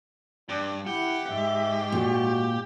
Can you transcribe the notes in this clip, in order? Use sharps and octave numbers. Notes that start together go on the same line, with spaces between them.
G2 D4
E4 G4 F#5
G#2 E5
A#2 F#4